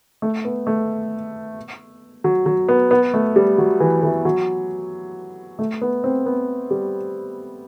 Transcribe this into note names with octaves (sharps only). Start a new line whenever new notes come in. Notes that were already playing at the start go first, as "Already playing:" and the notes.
A3
B3
A3
F#3
F#3
B3
B3
A3
G3
F#3
E3
E3
F#3
A3
B3
C4
B3
G3